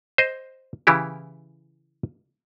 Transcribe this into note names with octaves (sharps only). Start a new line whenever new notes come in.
C5 D#5
C#3 E3 E4 G4